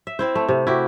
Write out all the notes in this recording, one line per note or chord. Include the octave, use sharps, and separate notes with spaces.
E5
C4 E4 C5
A3
C3
E4 F#4 G4